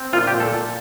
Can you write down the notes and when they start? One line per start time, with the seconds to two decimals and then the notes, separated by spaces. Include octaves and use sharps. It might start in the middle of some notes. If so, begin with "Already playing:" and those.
Already playing: C4
0.13 A#2 F4
0.27 G4
0.34 A#2
0.40 A4
0.54 A#2